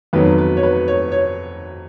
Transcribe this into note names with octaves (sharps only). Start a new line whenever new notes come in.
F2 D#3 F#3 B3 B4
B4
C#5
B4
C#5
C#5